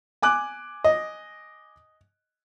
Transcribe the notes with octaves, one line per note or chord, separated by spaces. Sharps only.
G#5 D6 F#6
D#5